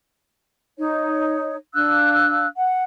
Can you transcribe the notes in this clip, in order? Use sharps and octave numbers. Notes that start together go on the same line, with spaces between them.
D#4 C#5
D4 F5 E6 F#6
F#5